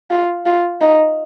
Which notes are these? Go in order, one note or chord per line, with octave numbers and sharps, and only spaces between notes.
F4
F4
D#4